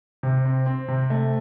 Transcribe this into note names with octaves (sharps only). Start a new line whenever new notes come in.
C3
C4
C4
C3
A3